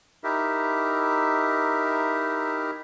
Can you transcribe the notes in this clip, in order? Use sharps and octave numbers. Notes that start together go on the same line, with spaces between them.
D#4 E4 G4 A#4 E5